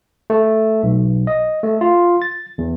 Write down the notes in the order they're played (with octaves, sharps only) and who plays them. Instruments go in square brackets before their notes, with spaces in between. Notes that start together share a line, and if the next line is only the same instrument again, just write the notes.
[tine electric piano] A3
B1
D#5
A3
F4
A6
E2